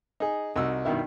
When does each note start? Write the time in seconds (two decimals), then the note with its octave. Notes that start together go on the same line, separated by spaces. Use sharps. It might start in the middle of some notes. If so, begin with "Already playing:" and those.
0.20 D#4 G#4
0.56 C2 D#4 F#4 E6
0.85 G2 B2 D#3 E4